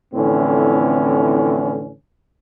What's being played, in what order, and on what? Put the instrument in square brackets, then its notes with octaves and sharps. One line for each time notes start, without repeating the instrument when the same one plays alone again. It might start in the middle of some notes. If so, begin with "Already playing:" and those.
[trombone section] F2 A2 D3 E3 C4 C#4